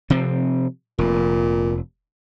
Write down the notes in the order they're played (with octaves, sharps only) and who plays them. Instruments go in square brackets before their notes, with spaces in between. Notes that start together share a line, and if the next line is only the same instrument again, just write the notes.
[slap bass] C3 F3 C4
[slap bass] F1 [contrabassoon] A#2